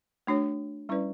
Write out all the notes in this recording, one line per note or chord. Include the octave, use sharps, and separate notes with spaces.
A3 D4 F#4 C#5
G3 C#4 E4 B4 D5